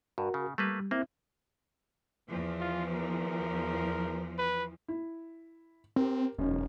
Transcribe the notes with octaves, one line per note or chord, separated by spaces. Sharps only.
G2 F#4 A#4
C#3
G3 A3 A#3 B4
A#3 C4 E4 E5
E2 E3 F3
F4
A#4
B4
E4
C4 G4 A#4
E1 F#2 C#4 D#4